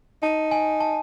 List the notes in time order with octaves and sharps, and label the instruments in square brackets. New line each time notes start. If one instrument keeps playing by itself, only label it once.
[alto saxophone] D#4 [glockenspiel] A5
[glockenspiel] G#5
A5